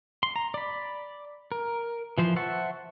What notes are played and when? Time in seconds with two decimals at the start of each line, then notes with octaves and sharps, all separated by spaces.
0.23 C6
0.36 A#5
0.54 D5 B5
1.52 A#4
2.18 E3 F3 C5
2.36 C5 E5 F#5 A5 C#6